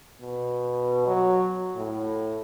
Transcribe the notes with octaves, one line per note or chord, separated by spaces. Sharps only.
B2
F#3
A2